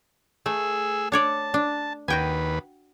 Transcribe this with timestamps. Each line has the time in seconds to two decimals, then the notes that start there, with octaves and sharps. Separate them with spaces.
0.46 A3 G#4 E6
1.12 D4 C#5 D5 A5
1.54 D4
2.08 D#2 F#4 B4 G5 G#5